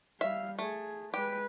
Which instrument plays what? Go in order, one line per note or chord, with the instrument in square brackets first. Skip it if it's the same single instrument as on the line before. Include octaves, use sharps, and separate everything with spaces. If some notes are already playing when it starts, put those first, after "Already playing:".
[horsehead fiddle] G3 F5 [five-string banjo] E5
[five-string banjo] A3 [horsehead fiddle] G#4
[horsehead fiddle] G#3 B4 [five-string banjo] G4